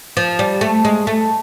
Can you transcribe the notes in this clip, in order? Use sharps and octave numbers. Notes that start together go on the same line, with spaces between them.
F3
G3
A3
G#3
A3